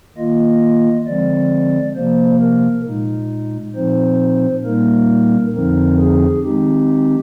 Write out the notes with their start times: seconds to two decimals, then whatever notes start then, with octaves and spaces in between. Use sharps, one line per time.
0.16 D#3 A#3 F4 D#5
1.07 D3 F3 G#3 C4 D5
1.95 C3 F3 A#3 C5
2.41 A#4
2.85 A#2 G#3 D#4
3.75 A#2 F3 C4 D#4 C5
4.64 A#2 G3 A#3 D#4 A#4
5.54 F2 D3 F3 C4 D#4 A#4
5.99 G#4
6.43 D#3 G#3 C4 D#4 G4